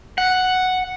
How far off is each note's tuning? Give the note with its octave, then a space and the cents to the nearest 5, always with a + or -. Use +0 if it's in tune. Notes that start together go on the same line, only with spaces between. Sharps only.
F#5 +0